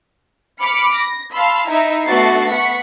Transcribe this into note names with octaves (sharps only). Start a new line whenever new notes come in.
B5 D6 F6 C#7
A#6
F5 A5 B5 C6 E6
D#4 E4 E5 A#5 B6
A3 B3 D4 F#4 A6 C7
B3 F#5 C#6 B6 C#7